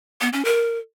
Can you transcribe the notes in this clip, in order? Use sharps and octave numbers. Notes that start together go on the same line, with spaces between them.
B3
C#4
A#4